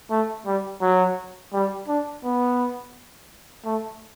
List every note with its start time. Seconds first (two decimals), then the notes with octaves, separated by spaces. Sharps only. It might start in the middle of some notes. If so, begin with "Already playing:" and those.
0.10 A3
0.46 G3
0.82 F#3
1.53 G3
1.88 D4
2.24 B3
3.65 A3